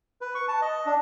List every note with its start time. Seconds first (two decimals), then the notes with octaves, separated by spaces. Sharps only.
0.21 B4
0.35 C#6
0.48 A5
0.62 D#5
0.86 D4